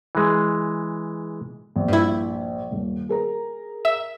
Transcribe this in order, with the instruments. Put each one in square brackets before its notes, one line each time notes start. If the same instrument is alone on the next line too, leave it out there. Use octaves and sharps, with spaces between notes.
[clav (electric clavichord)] E3 G#3
[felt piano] A#1
[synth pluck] G2 E4
[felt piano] D#1
G#4 A#4 A#5
[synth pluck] E5